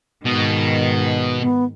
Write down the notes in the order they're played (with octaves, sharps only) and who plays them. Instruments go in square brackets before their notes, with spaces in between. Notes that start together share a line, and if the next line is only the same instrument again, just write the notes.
[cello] G#2 D#3 [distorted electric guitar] B2
[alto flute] B3